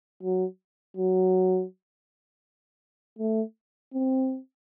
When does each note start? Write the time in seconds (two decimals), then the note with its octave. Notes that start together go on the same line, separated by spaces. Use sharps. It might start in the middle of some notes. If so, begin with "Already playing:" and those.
0.23 F#3
0.97 F#3
3.19 A3
3.94 C4